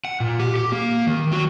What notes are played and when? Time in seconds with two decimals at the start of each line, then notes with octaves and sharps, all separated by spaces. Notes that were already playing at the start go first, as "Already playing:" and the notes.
0.05 F#5
0.20 A#2
0.40 G4
0.56 G4
0.72 A#3
1.07 D#3
1.31 F#3